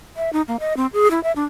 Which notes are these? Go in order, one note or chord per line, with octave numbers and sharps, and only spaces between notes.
E5
D#4
A#3
D#5
C4
G#4
E4
E5
D4